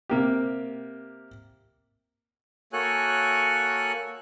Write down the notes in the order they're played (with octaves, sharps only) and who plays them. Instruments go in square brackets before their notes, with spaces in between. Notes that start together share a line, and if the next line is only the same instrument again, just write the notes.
[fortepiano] C3 A#3 G4
[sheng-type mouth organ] A#3 F#4 A4 C#5 G#5 F#6